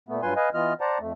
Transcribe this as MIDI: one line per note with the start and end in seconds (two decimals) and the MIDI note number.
0.09 0.22 46
0.09 0.22 57
0.09 0.22 59
0.22 0.34 43
0.22 0.34 54
0.22 0.34 65
0.22 0.34 71
0.22 0.34 80
0.22 0.34 84
0.36 0.49 71
0.36 0.49 75
0.36 0.49 77
0.36 0.49 80
0.54 0.73 52
0.54 0.73 59
0.54 0.73 65
0.54 0.73 75
0.54 0.73 89
0.81 0.98 72
0.81 0.98 74
0.81 0.98 78
0.81 0.98 81
0.81 0.98 82
1.00 1.13 41
1.00 1.13 57